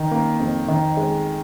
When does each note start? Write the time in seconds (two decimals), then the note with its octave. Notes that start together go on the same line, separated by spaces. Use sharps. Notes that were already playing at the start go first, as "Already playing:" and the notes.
Already playing: D#3
0.11 A#3
0.40 F2
0.68 D#3
0.97 G#3